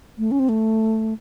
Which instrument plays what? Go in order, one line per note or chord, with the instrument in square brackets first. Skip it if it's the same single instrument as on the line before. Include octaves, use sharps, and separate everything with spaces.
[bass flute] A3
C#4
C4
A3